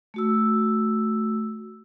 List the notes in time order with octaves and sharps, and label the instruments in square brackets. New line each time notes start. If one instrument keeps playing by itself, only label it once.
[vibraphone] A3 F#4 E6